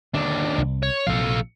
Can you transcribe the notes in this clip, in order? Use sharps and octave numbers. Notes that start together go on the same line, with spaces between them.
D#2 D3 D4
C2
C#5
A#1 C3 F3 A4 F5